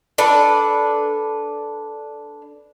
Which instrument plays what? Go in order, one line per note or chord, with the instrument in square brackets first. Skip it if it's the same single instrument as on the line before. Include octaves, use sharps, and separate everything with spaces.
[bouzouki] D4 A4 B4